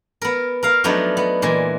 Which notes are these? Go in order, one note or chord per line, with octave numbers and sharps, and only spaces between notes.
B3 A#4
A#4 F5
F3 F#3 A3 B3 D4 D#4
B3
A#2 E3 G#3